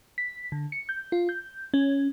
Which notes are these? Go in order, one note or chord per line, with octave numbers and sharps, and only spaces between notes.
B6
D3
C#7
G6
F4
G6
C#4